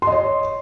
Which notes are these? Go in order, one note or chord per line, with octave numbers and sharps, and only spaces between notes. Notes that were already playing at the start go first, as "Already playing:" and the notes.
C#5 D#5 C6